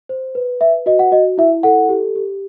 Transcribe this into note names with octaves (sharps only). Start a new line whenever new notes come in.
C5
B4
B4 E5
F#4 D#5
F#5
F#4 D#5
E4 E5
A4 F#5
G4
G4